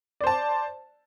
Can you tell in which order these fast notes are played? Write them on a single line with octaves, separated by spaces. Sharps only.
D5 C5 A5